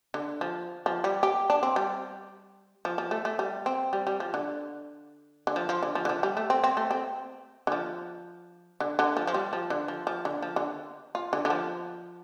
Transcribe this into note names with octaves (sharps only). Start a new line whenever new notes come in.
D3
F3
F3
G3
G4
D4
C4
G3
F3
F3
A3
A3
G3
C4
G3
G3
F3
D3
D3
F3
F3
D3
F3
D3
F3
G3
A3
C4
C4
A3
C4
D3
F3
D3
D3
F3
F3
G3
F3
D3
F3
F3
D3
F3
D3
F4
D3
D3
F3